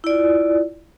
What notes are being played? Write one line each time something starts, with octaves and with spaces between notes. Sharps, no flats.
E4 F4 D5